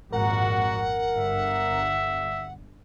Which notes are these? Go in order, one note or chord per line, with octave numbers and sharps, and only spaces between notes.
G#1 F2 A#2 F#4 A#4 F#5
G1 D3 E5